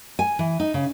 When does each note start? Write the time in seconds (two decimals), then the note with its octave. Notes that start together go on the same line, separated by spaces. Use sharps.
0.19 G#5
0.39 E3
0.60 D#4
0.74 C#3